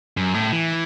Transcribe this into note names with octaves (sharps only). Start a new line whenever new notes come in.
F#2
A2
E3